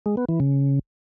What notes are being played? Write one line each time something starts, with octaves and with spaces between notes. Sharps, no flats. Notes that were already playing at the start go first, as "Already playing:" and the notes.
G#3
B3
E3
C#3